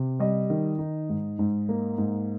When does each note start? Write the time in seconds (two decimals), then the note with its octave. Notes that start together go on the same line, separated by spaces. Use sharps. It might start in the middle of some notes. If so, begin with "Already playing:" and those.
Already playing: C3
0.20 G3 D#5
0.50 D#3
0.79 D#4
1.09 G#2
1.39 G#2
1.69 A#3
1.98 G#2